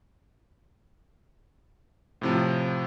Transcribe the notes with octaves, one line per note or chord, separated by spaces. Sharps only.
A2 C3 F3